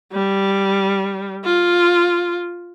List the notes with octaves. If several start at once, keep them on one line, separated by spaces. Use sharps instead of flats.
G3
F4